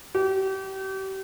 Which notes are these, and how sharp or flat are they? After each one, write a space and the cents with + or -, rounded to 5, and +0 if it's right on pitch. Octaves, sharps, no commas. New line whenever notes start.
G4 -35